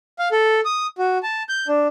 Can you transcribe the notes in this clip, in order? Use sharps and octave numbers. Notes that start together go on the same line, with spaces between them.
F5
A4
D#6
F#4
A5
G6
D4